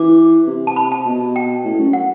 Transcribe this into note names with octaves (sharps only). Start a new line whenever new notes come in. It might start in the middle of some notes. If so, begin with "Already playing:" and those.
Already playing: E3 D6
C3
A5
B5
A5
B2
G5
A2
F#2
F#5